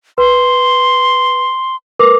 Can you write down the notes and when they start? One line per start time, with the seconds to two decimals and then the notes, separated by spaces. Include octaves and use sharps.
0.18 B4 C6
1.99 A#4 B4 D6